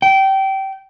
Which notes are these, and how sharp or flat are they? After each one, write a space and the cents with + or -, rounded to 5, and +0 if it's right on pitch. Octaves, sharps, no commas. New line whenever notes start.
G5 -20